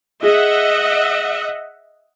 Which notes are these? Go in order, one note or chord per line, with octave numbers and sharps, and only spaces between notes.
G#4 D#5 E5 F#5